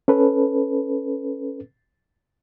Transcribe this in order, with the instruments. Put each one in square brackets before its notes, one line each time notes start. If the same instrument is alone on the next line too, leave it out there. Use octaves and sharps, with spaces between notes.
[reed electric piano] C#4 A4 B4